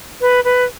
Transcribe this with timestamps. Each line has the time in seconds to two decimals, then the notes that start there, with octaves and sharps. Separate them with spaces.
0.21 B4
0.44 B4